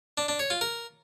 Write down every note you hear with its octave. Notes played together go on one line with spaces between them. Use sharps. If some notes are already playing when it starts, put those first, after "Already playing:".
D4
D4
C#5
F4
A#4